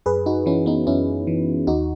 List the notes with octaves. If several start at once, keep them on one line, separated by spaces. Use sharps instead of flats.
F#2 G#4 B4
D#4 F#4
E3 C#4 E4
B3 D#4
F#2 C#4 E4
E3
D#2 D#4 F#4